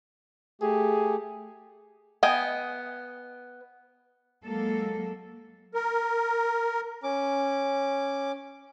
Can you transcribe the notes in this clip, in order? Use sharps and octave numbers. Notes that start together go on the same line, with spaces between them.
A3 G4 G#4
B3 D#5 G5 G#5
F#3 G#3 A#3 A4
A#4
C#4 D6